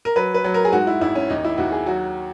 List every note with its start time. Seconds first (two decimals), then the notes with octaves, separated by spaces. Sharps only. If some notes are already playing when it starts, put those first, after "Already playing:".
0.05 A#4
0.16 F#3 B4
0.34 B4
0.44 F#3
0.54 A#4
0.65 G#4
0.72 G#2 F#4
0.87 E4
1.01 G#1 E4
1.15 C#4
1.30 D#2 D#4
1.44 E4
1.58 D#2 F#4
1.72 G#4
1.86 F#3 F#4